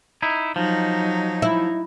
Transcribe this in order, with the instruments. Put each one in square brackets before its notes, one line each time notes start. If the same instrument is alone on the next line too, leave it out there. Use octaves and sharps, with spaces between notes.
[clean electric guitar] D#4 E4
[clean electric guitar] F3 [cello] F#3 D#4
[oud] E4